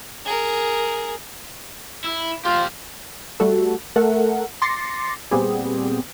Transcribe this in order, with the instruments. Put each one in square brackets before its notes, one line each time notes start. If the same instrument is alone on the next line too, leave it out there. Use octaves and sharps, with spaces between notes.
[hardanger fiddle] G#4 A#4
[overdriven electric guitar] E4
[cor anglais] F4 [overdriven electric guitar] G4 F5
[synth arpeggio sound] G3 A3 F#4 A4
A3 A4 A#4 F#5
C6 D6 A6 A#6 C7 C#7
A#2 G3 B3 C4 G4 G#4